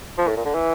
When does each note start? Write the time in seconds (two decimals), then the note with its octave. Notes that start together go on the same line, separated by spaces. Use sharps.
0.18 F3
0.27 A2
0.36 A#2
0.45 D3
0.54 E3